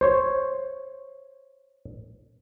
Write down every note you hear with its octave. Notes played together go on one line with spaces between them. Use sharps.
C5 C#5